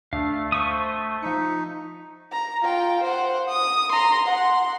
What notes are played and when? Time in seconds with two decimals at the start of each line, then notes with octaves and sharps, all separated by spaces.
0.13 D2 A3 D4 F5
0.52 C5 C#6 D#6 B6
1.23 F3 D#4 B6 C#7
2.32 A#5
2.62 F4 G5
3.03 C5 F#5
3.49 D#6
3.92 A#5 C6
4.26 F#5 C6